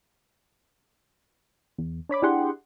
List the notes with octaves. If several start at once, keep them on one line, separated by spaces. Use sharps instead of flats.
E2
D4 C#5 B5 D6
D4 E4 G4 G#4 F#5 C6